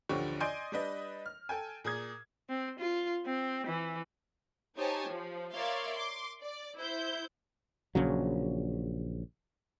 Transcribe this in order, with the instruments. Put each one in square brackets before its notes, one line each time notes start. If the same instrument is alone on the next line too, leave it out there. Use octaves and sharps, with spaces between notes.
[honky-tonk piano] A1 D2 D3 F3 G4 C#6
D5 D#5 G#5 C6 G6 D7
G3 D4 B4 D#5
F6
A4 G5 G#5
A#2 G#4 D#6 G#6
[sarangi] C4
F4
C4
E3
[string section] D#4 G4 C5 C#5 G#5 A5
F3
A#4 C#5 D5 E5 F5 C6
C6 D6
D5
E4 C5 G6
[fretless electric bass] A#1 C#3 F#3